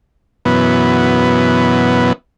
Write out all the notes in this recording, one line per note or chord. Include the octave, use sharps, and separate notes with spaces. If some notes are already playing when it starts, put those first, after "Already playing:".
F#2 B2 E3 B3